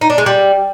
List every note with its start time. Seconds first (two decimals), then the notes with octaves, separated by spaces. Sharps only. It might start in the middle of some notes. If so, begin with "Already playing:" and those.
0.01 D#4
0.10 D4
0.18 G#3
0.26 G3